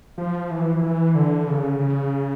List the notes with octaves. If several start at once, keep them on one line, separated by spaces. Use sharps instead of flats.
F3
E3
E3
D3
C#3
C#3